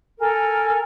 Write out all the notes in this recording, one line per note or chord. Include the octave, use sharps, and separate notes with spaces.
A4 A#4 G#5